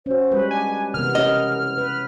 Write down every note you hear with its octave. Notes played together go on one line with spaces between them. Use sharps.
C#4 F#4 C5
G3 G#3 B4
D4 G#5
C3 E3 B3 A#4 F6
C#4 D#5
B4